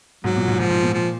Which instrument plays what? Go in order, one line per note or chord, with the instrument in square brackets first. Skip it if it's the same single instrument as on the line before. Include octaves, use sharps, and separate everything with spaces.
[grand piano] G#2 [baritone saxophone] F#3
[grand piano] A#2
G#2
[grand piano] G#2 [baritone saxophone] F3
[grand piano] G#2
A#2
[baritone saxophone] F3